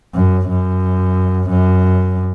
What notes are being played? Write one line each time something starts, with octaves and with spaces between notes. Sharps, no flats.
F#2
F#2
F#2